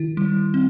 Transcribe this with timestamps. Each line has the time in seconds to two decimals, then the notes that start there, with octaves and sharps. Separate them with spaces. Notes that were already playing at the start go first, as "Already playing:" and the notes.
Already playing: D#3 E4
0.17 G3
0.54 C4